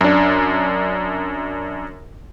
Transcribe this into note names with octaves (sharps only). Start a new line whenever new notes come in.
F#2 D4